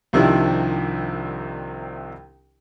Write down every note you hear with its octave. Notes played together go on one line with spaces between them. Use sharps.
C2 C3 D#3 F3 D4 E4